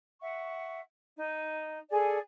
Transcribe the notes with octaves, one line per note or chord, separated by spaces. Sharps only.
E5 F#5 C#6
D#4
G#4 A4 D5 G#5